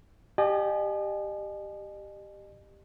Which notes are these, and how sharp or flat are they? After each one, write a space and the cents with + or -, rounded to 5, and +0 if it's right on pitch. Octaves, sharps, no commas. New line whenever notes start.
G4 +5 D#5 -40 G#5 +35